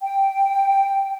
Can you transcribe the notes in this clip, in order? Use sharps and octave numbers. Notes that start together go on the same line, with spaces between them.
G5